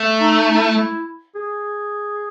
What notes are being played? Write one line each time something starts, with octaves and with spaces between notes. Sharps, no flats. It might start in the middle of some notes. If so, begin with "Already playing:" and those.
Already playing: A3
D#4
D#4
E4
G#4